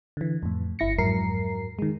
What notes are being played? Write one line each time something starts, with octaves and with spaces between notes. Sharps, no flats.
D3 E3
F2 A2
G1 E4 A#6 C#7
F2 G#2 F#3 A#4 C7
D#3 G#3